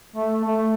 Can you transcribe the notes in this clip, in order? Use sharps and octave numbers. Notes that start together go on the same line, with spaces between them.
A3
A3